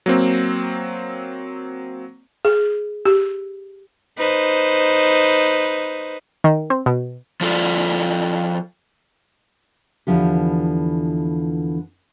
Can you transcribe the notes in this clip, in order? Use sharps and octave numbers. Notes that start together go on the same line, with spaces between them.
F#3 A#3 C4
G#4
G4
D#4 B4 C5
D#3
C4
B2
F3 F4 A4 D5
E2 D3 E3 F3 G4